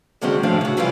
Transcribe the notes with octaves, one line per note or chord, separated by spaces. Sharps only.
D3 D#3 F#3 G#3 C4 C#4
A2 F3 A3 C#4 D4 F5
C#3 F#4
C3 E3 G3 C#4 F4 F5